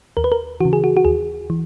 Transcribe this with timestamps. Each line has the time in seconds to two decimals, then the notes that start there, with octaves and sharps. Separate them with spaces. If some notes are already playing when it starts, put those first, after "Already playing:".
0.17 D#2 A#4
0.24 B4
0.32 A#4
0.61 C#3 E3 F#4
0.73 G#4
0.84 F#4
0.97 F#4
1.05 D#2 G#4
1.50 E3